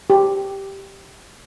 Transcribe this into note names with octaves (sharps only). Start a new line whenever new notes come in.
G4